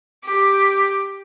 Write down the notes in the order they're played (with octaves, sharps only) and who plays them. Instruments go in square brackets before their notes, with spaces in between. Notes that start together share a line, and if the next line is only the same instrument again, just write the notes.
[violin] G4